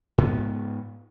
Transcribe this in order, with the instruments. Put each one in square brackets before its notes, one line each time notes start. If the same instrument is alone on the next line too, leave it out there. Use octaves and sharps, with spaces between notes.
[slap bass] G#2 B3